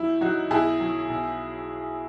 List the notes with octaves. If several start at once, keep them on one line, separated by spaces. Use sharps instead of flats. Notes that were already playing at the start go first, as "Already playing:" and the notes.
Already playing: E2 F#3 E4
F#3 D#4 F#4
B1 E4 G#4
F#3
B1